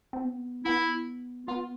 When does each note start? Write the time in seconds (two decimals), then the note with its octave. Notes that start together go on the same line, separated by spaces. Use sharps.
0.13 C4
0.24 B3
0.65 B3 E4
1.48 B3 F4